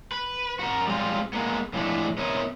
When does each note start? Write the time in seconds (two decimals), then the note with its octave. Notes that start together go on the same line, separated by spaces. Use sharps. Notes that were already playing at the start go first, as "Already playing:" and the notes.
0.12 B4
0.59 F#4 A#4
0.87 G3 G#3 C4 F4
1.33 G#3 A#3 B3
1.73 F2 A2 E3 G#3 A3 D4
2.18 B3 C4 A#4 C#5 D#5 E5